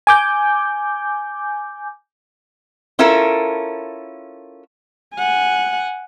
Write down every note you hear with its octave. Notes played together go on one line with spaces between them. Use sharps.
G#5 D6 G6
C#4 E4 F4 A4 A#4
F#5 G#5